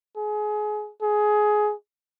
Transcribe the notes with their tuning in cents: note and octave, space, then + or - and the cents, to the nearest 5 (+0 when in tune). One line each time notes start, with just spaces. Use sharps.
G#4 +25
G#4 +15